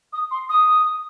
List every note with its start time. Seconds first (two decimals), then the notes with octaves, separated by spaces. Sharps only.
0.12 D#6
0.31 C6
0.49 D#6